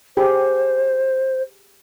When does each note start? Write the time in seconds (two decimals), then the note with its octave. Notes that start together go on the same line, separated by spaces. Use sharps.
0.17 G4 G#4 C5